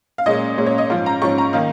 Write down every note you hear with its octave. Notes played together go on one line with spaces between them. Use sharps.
F5
A#2 G#3 C#4 D#5
A#2 G#3 C#4
C#5
D#5
G#2 F3 C#4 F5
A#5
G#2 F3 C#4 C#6
A#5
D#3 A#3 D#4 F5